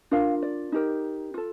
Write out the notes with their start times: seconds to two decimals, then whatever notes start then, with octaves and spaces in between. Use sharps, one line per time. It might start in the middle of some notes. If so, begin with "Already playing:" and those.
0.11 D4 F4 A#4 F5
0.42 D5
0.72 D#4 G4 A#4
1.34 F4 A4